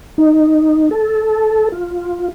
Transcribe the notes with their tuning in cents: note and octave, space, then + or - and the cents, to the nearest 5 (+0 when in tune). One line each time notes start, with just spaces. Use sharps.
D#4 -5
A4 -15
F4 +5